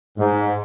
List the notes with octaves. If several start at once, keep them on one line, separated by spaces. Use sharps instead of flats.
G#2